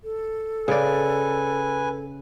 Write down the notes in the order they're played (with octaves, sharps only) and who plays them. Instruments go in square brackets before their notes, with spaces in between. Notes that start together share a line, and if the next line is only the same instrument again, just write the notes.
[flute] A4
[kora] C#3 D5 [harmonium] B4 G#5